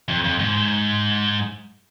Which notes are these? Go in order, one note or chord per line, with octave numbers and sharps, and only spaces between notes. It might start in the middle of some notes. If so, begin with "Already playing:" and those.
F2
F2
G#2